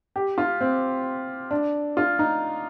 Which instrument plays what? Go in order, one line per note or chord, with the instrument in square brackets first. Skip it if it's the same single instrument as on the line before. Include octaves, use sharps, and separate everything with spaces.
[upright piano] G4
F4
C4
D4
F4
D#4